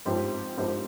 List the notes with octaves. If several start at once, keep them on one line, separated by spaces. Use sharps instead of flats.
G#2 F3 C4 G4 C5
G#2 F3 C4 G4 C5